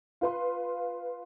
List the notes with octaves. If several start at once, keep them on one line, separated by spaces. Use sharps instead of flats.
F4 B4 C6